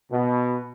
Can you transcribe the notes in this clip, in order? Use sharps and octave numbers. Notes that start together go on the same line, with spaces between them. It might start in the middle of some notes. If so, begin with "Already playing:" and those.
B2